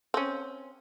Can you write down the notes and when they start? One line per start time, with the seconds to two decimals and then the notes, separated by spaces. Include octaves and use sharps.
0.14 C4 C#4